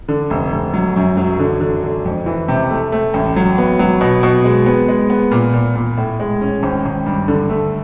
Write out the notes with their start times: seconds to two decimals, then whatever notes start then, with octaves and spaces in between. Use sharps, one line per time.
0.08 D3
0.30 F1
0.52 F1
0.74 F#3
0.96 F#2
1.17 F#3
1.39 D3
1.61 D3
1.84 D3
2.05 F2
2.26 E3
2.48 C3
2.71 A3
2.92 A3
3.14 A1
3.36 F#3
3.58 B3
3.79 F#3
4.01 B2
4.23 B2
4.44 G#3
4.66 B3
4.88 G#3
5.10 B3
5.31 A#2
5.54 A#2
5.75 A#2
5.97 A2
6.20 G#3
6.41 C#4
6.63 G#1
6.85 G#1
7.06 G2
7.28 D3
7.50 A3